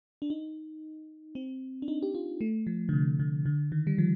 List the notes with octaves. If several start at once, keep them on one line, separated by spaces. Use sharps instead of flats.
D4
D#4
C4
D4
D#4
G4
F4
A3
F3
D3
C3
D3
D3
D#3
G3
F3